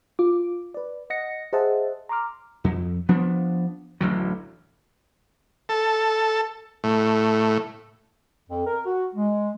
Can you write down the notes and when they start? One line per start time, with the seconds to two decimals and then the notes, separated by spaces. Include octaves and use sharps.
0.19 F4 D6
0.74 B4 D5
1.10 D#5 F#5 A#6 C#7
1.53 G#4 C5 D#5 E5 F#5 A5
2.09 A#5 C6 D6 F6
2.64 F2
3.09 F3 B3 D4
4.01 D1 A1 D3 F#3
5.69 A4
6.84 A2
8.49 F2
8.67 A#4
8.86 F#4
9.15 G#3